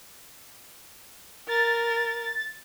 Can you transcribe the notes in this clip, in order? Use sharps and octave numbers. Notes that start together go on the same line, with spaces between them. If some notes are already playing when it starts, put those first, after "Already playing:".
A#4 A6